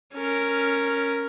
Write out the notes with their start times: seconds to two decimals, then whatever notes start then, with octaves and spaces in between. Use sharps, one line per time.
0.14 C#4 A#4